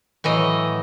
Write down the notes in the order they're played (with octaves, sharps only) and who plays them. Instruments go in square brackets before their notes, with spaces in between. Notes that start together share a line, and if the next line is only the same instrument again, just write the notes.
[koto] A2 E3 F#3 D#5